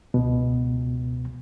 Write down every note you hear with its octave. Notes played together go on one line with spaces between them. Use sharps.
C#2 B2